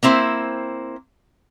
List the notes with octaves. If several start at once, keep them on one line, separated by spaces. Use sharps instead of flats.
A#3 C4 E4 C5